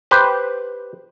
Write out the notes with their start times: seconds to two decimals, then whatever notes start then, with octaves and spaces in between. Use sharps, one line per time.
0.11 G4 B4 C5